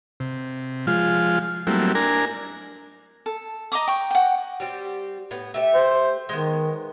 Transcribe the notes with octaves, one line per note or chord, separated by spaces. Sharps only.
C3
F3 G#3 F4
F#3 G3 A3 A#3 C4 E4
D4 A#4 G#5 A#5
A4
D#5 A#5 D6 D#6
G5 C#6
F#5 G5
G3 C4 G4
A2 B3
A3 G4 E5
C5
D#3 G#3 B3